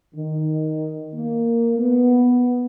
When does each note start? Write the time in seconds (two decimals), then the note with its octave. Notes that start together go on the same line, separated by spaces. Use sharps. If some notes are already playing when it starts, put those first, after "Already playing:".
0.15 D#3
1.14 A#3
1.80 B3